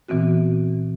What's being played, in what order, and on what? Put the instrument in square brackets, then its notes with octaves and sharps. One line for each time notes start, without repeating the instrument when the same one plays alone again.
[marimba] A#2 E3 B3 C4 F#4